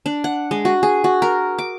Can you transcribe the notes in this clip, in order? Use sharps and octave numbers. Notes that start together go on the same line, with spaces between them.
D4
F#5
G#3
F#4
G#4
F#4
A#4
D6